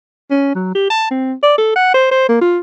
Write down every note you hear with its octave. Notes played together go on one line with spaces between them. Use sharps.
C#4
F#3
G4
A5
C4
D5
A4
F#5
C5
C5
A#3
F4